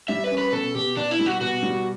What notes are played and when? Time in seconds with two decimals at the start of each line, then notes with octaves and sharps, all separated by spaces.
0.08 G3 E5
0.24 B4
0.31 C#4
0.38 B4
0.52 B2 A4
0.75 B2 G4
0.96 B2 D4
1.11 E4
1.19 G3
1.26 F#4
1.41 B2 F#4
1.63 G3